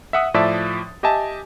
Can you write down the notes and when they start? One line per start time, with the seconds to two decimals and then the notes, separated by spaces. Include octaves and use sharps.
0.13 E5 F#5 D#6
0.34 A2 F3 D5 E5 A5 A6
1.03 G4 D#5 E5 G#5 A5